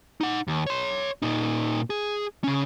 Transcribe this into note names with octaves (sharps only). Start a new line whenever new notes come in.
D#4 F#5
D#2
C#5 C6
A#2 D#4
G#4
C#3 C#4